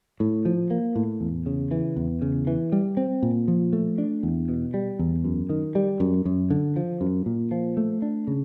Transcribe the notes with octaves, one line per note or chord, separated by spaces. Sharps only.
A2
F3
A#3
A2
E2
C#3
E3
E2
C#3
E3
G3
C4
A#2
F3
A3
D4
E2
B2
G3
E2
F#2
D#3
G3
F#2
F#2
D3
F3
F#2
A#2
F3
A3
D4
C#3